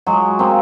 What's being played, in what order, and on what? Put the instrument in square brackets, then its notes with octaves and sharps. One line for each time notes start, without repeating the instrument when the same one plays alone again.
[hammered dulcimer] F#3 G#3
A#3 C4